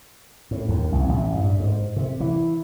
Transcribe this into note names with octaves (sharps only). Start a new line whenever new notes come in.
A2
D#2
C2
A1
G2
G#2
C3
E3